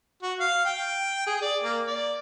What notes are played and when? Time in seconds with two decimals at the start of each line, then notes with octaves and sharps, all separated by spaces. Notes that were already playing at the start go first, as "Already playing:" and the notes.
0.23 F#4
0.40 F5
0.66 G5
1.27 G#4
1.42 D5
1.64 A#3
1.87 D5